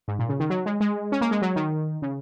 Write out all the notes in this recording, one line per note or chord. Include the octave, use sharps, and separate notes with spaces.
G#2
A#2
C#3
D#3
F#3
G#3
G#3
C#4
A#3
G#3
F#3
D#3
C#3